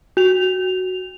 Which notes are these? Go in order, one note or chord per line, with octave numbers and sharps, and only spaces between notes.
F#4 F7